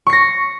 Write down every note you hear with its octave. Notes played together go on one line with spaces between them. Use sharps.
C#6 A#6 C7